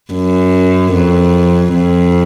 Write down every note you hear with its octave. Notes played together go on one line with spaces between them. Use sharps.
F#2
F2
F2